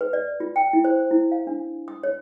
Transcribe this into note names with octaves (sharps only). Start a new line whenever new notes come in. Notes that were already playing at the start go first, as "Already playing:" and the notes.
B4
D5
F4
G5
E4
C5
E4
F5
D4
D#6
C#5